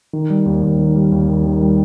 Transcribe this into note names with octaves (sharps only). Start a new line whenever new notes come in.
D#3
G3
D#2
D#2
D#3
G3
D#2
D#2
D#3
G3